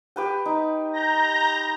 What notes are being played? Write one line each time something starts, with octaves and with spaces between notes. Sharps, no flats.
G4 B4 G5
D#4
A#5 G6 A#6